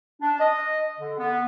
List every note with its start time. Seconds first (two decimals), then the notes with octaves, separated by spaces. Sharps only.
0.22 D4
0.40 D#5
0.99 D3
1.19 B3